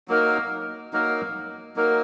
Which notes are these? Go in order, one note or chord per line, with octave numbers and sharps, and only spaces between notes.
F#3 A#3 D#4 A#4
F#3 A#3 D#4 A#4
F#3 A#3 D#4 A#4